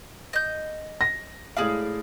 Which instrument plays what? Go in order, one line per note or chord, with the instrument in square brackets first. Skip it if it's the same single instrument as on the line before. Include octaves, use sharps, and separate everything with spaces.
[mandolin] D#5 G6
[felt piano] A#6
[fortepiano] A2 G#3 F5 [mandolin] G#4 D5 D6